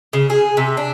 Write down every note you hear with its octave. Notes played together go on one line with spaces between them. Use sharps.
C#3
G#4
C3
D4